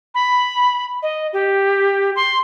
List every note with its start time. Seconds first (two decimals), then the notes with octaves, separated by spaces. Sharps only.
0.15 B5
1.03 D#5
1.33 G4
2.16 C6